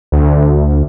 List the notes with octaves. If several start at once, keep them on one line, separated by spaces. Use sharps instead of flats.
D2